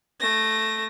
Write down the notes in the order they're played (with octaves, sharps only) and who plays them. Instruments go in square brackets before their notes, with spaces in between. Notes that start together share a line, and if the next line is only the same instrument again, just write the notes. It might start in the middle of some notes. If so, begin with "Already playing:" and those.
[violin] A3 A#6